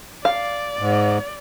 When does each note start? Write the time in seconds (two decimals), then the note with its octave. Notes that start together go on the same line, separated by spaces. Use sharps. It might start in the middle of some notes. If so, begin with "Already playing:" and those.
0.25 D5 F5
0.79 G#2